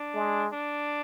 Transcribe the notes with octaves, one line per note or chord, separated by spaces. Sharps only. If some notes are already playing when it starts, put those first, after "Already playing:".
Already playing: D4
G#3
D4